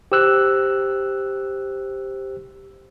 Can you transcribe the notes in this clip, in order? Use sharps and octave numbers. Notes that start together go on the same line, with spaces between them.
G4 C5 E6 F#6